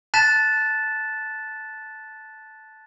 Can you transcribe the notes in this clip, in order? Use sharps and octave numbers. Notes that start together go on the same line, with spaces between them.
A5 F#6 A6 B6 E7